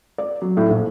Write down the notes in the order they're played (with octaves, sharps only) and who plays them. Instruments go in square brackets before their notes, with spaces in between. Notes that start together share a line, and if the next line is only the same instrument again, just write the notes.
[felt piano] D5
F#3
A2
A#1